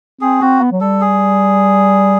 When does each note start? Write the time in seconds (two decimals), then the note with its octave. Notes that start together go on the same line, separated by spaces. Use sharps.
0.21 C4 G#4
0.41 C4 F#4
0.61 B3
0.72 F#3
0.81 G3 A4
1.01 G#4